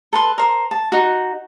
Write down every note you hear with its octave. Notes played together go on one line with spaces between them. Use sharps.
A4 B4 C6
A#4 C5
A5
D#4 F#4